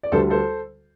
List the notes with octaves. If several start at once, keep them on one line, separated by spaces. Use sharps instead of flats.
D5
D2 D3 G3 A4 C5
A4 C5